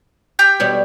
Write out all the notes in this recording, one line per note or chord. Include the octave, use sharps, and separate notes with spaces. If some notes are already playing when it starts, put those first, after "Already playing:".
G4 G5 G6
B2 G3 C#5